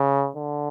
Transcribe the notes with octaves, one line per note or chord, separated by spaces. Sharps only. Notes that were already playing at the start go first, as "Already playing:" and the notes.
Already playing: C#3
D3